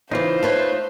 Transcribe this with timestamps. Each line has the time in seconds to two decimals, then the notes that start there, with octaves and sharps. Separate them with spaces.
0.11 C#3 E3 D#4 F4 C5
0.43 A3 B4 C#5